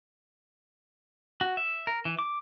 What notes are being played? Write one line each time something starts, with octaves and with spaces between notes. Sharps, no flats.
F#4
E5
A#4
E3
D6